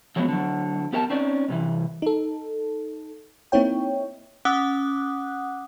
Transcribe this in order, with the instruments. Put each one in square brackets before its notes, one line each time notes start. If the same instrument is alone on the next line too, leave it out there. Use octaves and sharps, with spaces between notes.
[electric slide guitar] F3 F#3 G#3 A3 B3
D3 F#3
B3 G4 A#4 F#5 A5
C4 C#4 D#4 D5
G2 C3 E3
[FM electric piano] D#4 A4
A#3 C4 D#4 E4 C#5 G5
[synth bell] C#4 F#5 D6 D#6 F#6